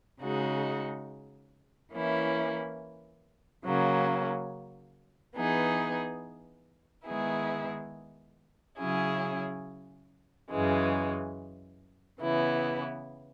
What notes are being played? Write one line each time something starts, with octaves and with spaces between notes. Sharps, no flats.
C#3 G#3 D#4 F#4
E3 A#3 C#4 E4
C#3 F#3 A#3 C#4
E3 B3 D#4 G#4
D#3 G#3 B3 E4 G#4
C#3 F#3 C#4 E4 G#4
F#2 C#3 E3 G#3
C#3 E3 B3 E4